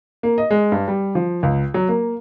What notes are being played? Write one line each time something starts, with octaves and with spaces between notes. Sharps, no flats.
A#3
D#5
G#3
G2
G3
F3
C#2
F#3
A#3